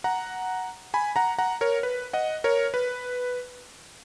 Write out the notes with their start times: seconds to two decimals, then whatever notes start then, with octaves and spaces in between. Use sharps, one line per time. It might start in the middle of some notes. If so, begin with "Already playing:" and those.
0.04 F#5 A#5
0.94 G#5 B5
1.16 F#5 A#5
1.38 F#5 A#5
1.61 A#4 C#5
1.83 B4
2.13 D#5 F#5
2.44 A#4 C#5
2.74 B4